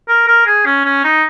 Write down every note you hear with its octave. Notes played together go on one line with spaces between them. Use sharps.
A#4
A#4
G#4
C#4
C#4
D#4